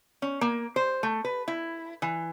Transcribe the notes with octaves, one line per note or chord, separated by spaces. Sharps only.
C#4
A#3
C5
A3
B4
E4
E3